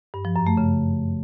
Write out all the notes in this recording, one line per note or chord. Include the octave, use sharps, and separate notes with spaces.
G2
F3
F#2
A3
C#3